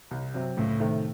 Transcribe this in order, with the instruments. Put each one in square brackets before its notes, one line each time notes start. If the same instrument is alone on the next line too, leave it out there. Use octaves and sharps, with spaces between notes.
[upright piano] C2
C3 F#3 C4
[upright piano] C#2 [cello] A2
[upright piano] C3 D#3 A3